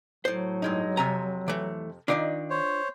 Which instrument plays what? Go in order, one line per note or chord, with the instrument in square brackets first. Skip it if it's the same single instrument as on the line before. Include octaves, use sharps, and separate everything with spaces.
[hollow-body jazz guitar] A2 C5 [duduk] F#3
[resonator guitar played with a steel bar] G2 G#3 D#4
[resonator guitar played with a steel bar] F2 C3 G#5 [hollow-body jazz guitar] A#5
[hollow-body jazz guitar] E3 A3
[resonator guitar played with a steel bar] D#3 D#4 [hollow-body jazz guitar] D4 F4 D5
[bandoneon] C5 C#5